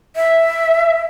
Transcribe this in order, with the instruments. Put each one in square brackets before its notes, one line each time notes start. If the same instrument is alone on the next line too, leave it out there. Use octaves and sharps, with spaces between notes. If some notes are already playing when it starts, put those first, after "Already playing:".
[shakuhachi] E5